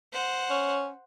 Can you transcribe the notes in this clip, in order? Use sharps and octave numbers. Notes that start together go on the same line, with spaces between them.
C5 F#5
C#4